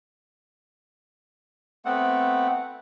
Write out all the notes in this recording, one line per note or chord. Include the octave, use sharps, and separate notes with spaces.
A3 B3 C4 F#5